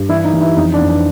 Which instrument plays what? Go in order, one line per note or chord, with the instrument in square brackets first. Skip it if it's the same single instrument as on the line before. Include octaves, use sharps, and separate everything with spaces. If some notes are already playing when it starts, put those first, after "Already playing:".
Already playing: [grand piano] G2
E3 E4
D#4
E3
E4
F2 D#4
D4
F2
D4